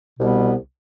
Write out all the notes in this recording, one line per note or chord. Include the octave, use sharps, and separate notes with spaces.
C2 B2 G3 B3